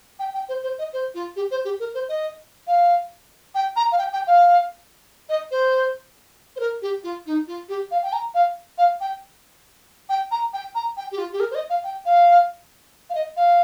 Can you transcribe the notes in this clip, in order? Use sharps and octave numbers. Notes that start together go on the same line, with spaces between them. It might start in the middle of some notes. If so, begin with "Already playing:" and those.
G5
G5
C5
C5
D#5
C5
F4
G4
C5
G4
A#4
C5
D#5
F5
G5
A#5
F5
G5
G5
F5
D#5
C5
C5
A#4
G4
F4
D#4
F4
G4
F5
G5
A#5
F5
F5
G5
G5
A#5
G5
A#5
G5
G4
F4
G4
A#4
C5
D#5
F5
G5
F5
F5
D#5
F5